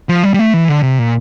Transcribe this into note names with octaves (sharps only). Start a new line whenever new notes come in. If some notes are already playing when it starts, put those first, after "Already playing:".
F3
G3
G3
A3
E3
D3
C3
A#2